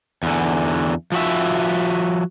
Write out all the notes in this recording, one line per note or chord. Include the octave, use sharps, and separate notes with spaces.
E2 D3
F3 F#4 E5